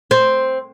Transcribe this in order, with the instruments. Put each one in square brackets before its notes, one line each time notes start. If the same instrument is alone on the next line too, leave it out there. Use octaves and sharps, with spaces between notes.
[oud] C4